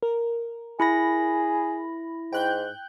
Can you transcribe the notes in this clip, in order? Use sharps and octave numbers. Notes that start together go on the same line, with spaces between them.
A#4
E4 G#4 B5 A#6
G#2 G5 F#6 G6